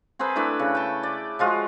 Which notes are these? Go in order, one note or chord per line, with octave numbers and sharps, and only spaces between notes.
C4 G#4 A#4 B4
A3 D4 E4 B4
C#3
G5 A5
D5
F3 G#3 F4 F#4